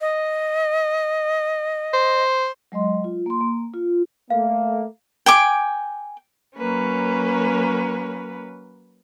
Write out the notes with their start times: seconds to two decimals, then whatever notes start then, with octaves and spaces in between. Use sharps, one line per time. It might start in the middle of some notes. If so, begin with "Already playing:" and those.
0.01 D#5
1.93 C5
2.72 F#3 G#3 D#5 C6
3.04 F4
3.26 A#3 C6
3.41 A#3
3.74 F4
4.30 A3 A#3 F5
5.26 G5 G#5 D6
6.57 F#3 A#3 C#4 B4